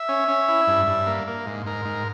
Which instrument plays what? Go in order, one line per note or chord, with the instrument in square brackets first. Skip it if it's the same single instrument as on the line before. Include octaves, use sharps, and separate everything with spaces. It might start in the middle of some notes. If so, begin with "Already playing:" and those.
Already playing: [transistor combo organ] E5
C#4
C#4
E4
G2
G2
A#3
A#3
G#2
G#2 A#4
G#2